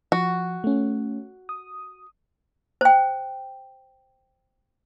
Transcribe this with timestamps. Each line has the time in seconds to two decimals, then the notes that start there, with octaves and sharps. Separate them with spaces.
0.12 F3 F#4
0.64 A3 C#4
1.49 D#6
2.81 C5 G5